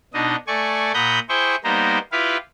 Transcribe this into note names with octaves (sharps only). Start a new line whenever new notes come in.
B2 D4 D#4 D#5
A3 D5 G#5 C#6
A#2 F#5 A#5 B5 D#6 G6
E4 G#4 C5 G5 C#6
G3 A#3 B3 D#4 A#4 C5
E4 F4 G4 B4 F5